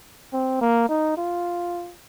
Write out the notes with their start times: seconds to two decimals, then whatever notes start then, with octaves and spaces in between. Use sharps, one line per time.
0.33 C4
0.61 A#3
0.89 D#4
1.17 F4